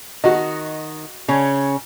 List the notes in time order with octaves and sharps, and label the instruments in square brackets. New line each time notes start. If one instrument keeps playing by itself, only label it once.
[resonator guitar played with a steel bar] D#3 [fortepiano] F#4 D#5
[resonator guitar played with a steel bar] C#3 C#4